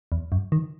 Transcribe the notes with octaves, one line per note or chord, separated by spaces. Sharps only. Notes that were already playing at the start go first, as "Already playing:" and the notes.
E2
F#2
D#3